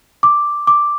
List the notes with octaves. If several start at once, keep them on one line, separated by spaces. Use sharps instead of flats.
D6
D6